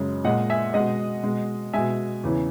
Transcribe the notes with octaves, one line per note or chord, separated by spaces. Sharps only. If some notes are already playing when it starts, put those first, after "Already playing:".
Already playing: F#2 C#3 G#3
A#2 G#3 D#5 F#5
E5 G#5
B2 G#3 D#5 F#5
B2 G#3
B2 G#3 E5 G#5
E2 C#3 E3